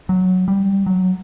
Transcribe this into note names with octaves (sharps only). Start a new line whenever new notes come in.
F#3
G3
F#3